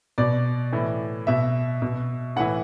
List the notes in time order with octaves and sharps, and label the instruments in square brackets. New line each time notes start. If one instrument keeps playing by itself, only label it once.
[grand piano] B2 D5
A2 E3
B2 E5
B2
A2 E3 F#5